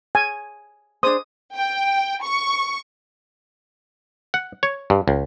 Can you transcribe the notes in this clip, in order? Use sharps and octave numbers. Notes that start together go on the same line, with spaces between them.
G#5
D4 G#4 C5 D#6
G5
C#6
F#5
C#5
G2
C#2